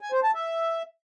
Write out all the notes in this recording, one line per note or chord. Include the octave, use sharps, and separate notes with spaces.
G#5
C5
A5
E5